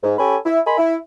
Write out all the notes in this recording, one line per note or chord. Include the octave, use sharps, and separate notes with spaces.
G#2
C#4 G4 A4 G#5 B5
E4
A#4 D#5 G#5 B5 C6
E4